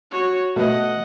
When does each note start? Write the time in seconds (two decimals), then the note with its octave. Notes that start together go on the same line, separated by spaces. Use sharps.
0.11 F#4 C#5
0.56 B2 A3 B3 D#5 F#5